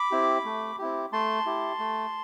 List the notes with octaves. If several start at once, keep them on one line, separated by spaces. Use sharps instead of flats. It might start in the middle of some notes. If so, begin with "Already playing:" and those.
Already playing: B5 D6
C4 E4 G4
A3
C4 E4 G4
A3 A5 C6
E4 G4
A3